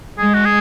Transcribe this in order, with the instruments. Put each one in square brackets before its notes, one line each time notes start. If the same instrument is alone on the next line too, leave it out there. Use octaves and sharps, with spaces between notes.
[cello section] G#3 [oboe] G#4
[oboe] F#4
G#4